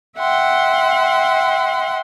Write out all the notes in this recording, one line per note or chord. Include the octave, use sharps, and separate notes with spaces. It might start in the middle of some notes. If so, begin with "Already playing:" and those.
E5 F#5 G5 C6